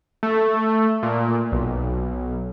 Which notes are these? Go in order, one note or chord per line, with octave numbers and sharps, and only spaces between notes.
A3
A#2
B1